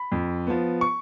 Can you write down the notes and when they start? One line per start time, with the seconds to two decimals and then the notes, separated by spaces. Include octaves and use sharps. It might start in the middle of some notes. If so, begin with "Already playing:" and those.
Already playing: B5
0.12 F2
0.47 F3 B3
0.81 C#6